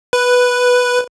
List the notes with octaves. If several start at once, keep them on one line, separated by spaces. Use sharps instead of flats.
B4